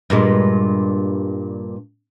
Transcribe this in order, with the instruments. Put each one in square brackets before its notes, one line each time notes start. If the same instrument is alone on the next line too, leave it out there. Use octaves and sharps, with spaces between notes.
[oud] G2 A#2 G#3